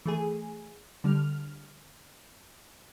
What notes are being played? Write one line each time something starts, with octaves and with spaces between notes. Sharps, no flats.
E3 A3 G#4
D3 G3 F6